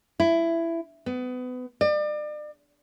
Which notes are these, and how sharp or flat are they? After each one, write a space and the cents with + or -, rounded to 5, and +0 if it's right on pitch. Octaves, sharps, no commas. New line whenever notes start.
E4 +15
B3 +30
D5 +40